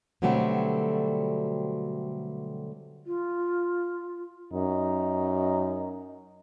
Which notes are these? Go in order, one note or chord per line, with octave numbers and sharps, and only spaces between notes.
B2 D3 F#3 G3 A3 C4
F4
F#2 D#4